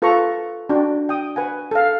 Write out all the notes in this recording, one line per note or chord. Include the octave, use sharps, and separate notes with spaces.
F4 A4 B4 A#5 C#6
D4 F#4 G5
G5 D#6
B4 F#5 G#5
A4 F5